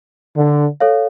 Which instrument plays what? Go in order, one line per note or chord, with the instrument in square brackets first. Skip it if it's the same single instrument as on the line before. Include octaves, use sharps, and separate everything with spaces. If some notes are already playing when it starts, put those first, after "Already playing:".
[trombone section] D3
[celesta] A4 C#5 F5